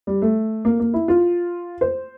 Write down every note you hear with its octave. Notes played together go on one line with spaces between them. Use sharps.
G3
A3
A#3
A#3
E4
F4
C5